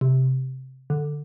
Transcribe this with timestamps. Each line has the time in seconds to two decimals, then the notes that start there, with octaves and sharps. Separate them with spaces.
0.01 C3
0.90 D3